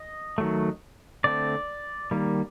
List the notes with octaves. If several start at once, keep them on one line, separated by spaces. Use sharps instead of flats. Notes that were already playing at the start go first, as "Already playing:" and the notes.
Already playing: D#5
D#3 F#3 A3
D3 A3 C4 D5
D#3 G3 A#3